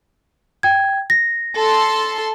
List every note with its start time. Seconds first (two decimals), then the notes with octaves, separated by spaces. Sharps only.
0.63 G5 G#6
1.10 A#6
1.58 A4 C6